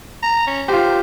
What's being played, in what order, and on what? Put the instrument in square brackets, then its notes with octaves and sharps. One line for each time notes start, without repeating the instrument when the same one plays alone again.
[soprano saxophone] A#5
C#4
[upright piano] F4 G4 [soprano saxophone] C5